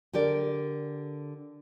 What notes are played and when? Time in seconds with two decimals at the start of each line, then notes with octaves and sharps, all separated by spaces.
0.13 D3 G4 A#4 D5